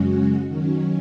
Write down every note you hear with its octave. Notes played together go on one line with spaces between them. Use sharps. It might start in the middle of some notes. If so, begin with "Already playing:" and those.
Already playing: F#2 C#3 G#3 C#4 F#4
D#3 F#3 C#4